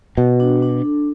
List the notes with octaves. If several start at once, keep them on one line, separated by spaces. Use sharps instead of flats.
B2 F#4
D4
D4
A4